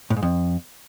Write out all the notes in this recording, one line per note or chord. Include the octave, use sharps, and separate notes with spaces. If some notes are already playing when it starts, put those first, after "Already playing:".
A2
G#2
F2